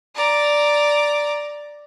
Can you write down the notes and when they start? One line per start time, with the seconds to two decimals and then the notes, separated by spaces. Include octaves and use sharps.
0.16 D5 A#5